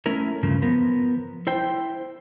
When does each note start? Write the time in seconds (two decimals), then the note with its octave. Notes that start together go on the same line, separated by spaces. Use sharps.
0.06 A3 C#4 E4 A#4
0.43 G2 C#3 F3
0.62 F3 B3 A#4
1.47 E4 C5 G5